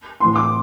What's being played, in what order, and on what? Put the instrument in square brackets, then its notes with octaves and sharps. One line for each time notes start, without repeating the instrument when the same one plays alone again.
[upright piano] A2 E3 C6
D6